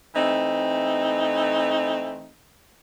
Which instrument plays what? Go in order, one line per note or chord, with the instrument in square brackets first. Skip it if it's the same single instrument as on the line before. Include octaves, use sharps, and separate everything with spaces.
[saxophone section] E3 A3 C4 D#4